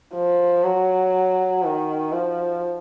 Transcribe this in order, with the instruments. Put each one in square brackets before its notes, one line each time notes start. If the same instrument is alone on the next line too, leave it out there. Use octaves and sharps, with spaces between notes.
[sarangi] F3
F#3
D#3
F3